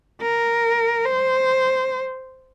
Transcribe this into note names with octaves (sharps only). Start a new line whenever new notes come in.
A#4
C5